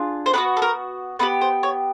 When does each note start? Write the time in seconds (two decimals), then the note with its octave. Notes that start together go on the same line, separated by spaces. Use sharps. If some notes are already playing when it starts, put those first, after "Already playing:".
Already playing: D4 F4 G#4
0.26 C5
0.33 B3 D4 B4
0.38 F#4
0.57 A4
0.62 A#4
1.19 B3 D#4 G4 B4
1.41 C5
1.63 C#5